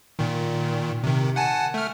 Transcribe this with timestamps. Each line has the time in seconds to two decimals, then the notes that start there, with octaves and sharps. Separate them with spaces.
0.19 A#2 D#3
1.04 C3 D#3
1.36 F#5 G#5 A5
1.74 A3 F6